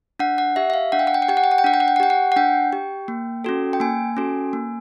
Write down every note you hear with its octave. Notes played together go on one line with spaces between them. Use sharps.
D4 F#5
F#5
G4 E5
E5
F5
D4 F#5
G5
F#5
G5
F#5
G4 G5
F#5
G5
F#5
G5
D4 F#5
G5
F#5
G5
F#5
G4 G5
F#5
F#5
D4 G5
G4
A#3
C#4 F#4 A4
G5
A#3 G#5
C#4 F#4 A4
A#3